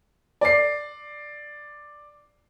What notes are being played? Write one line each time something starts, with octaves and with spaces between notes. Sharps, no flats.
D5 C7